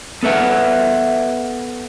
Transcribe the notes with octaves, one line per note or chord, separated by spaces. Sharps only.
B3 A4 B4 E5 F#5